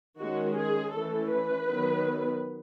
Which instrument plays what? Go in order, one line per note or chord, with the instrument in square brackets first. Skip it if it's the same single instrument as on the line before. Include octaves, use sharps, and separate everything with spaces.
[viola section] D#3 G#3 C#4 F#4
G#4
E3 A3 C#4 A4
B4
D#3 F#3 B3